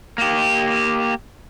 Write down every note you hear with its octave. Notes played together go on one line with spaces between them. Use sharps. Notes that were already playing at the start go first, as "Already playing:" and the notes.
A#3 G4